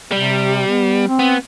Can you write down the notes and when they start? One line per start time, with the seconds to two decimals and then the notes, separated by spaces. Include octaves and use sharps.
0.12 C3 G3
0.67 B3
1.08 C4
1.19 B3